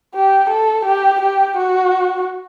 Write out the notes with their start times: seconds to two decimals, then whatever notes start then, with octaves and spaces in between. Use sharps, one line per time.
0.14 G4
0.49 A4
0.85 G4
1.21 G4
1.57 F#4